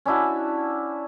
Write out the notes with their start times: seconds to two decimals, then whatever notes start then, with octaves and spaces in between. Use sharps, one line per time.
0.06 C#4 D4 E4 F#4